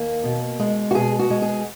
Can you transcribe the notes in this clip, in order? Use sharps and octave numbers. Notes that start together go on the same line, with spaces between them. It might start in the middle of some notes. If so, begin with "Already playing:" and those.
Already playing: D#2 A#3
B2
G#3
F#4
B2 G#4
F#4
G#3
G#4